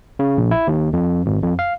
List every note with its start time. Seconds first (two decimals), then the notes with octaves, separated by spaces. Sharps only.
0.19 C#3
0.38 A#1
0.51 E4
0.67 D#2
0.93 F2
1.26 G#1
1.43 F2
1.59 F5